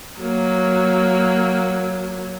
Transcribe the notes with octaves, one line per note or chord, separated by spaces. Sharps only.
F#3 A#3